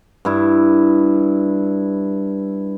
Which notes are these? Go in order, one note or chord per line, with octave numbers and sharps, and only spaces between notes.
G2 E4